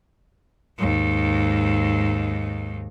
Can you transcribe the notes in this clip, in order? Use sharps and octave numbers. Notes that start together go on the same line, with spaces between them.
D#2 G#2